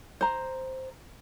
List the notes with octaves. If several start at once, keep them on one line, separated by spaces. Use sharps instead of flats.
C5 A#5